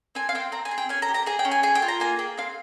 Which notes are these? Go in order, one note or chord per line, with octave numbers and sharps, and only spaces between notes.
C4 G#5
F5
C4 G5
C4 A#5
G#5
G#4
G5
C#4 G#5
A#5
G4
A#5
G#4 G#5
G5
C#4
G#5
G#4 G#5
G5
F4
A#5
A#3 G#5
G#4 G5
C4 F5